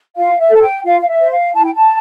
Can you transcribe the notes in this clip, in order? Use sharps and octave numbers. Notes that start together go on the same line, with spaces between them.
F4 F5
E5
A4 C5 A5
G5
F4 F5
F5
E5
C5
F5
E4 A5
G5
A5